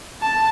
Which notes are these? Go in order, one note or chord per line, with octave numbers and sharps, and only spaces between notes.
A5